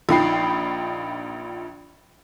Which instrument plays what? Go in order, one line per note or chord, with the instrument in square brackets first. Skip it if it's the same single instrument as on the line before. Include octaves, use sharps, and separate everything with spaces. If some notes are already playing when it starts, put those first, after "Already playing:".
[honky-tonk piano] A#1 F3 D#4 G5 B5 C7